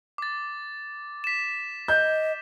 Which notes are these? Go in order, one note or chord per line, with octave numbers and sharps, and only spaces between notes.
D6 A6
B6 E7
D#5 G6